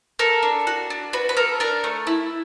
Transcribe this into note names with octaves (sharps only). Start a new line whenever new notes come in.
A4 A#4
D4
F#4
D4
F#4 B4
B4
A4 A#4
D4 A#4
A3
E4